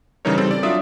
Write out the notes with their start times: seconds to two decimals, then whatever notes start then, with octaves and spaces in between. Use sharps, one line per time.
0.25 C#3 E3 G3 D#4 A#4 C#5
0.38 G3 C4 A4
0.51 D5
0.63 F#3 D4 F4 D5 E5 D#6